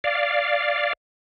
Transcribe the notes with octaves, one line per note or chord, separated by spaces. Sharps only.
D5 F5